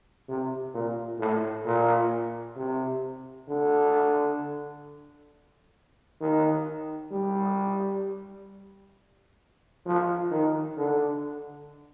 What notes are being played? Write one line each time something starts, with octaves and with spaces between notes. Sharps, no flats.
C3
A#2
A2
A#2
C3
D3
D#3
G3
F3
D#3
D3